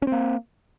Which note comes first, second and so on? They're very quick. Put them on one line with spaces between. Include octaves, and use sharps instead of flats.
C#4 C4 A#3